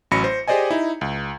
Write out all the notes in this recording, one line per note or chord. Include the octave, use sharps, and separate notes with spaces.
A1 F#3 C#4 B5 A#6 C#7
C5
G4 G#4 C5 D5 D#5 G#5
D#4 E4
C#2